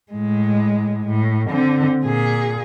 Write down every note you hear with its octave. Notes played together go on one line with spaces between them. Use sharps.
A2 G#3
A2
D3 C4
A#2 G#4